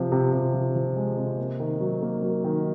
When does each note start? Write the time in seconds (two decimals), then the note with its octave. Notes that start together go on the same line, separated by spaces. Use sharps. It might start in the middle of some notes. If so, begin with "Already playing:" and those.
Already playing: C3 F3
0.12 C3
0.33 C3
0.54 F3
0.75 F3
0.96 G#3
1.17 C3
1.38 A#3
1.60 D#3
1.80 F#3
2.02 A#3
2.22 F#3
2.44 D#3